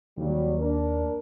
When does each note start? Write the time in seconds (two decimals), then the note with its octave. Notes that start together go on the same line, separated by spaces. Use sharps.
0.18 D#2 F#3 G3
0.59 D4 A#4